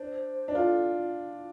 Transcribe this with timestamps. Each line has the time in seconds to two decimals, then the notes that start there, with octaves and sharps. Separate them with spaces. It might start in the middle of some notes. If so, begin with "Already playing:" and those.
Already playing: D4 C5
0.48 D4
0.55 F4 A4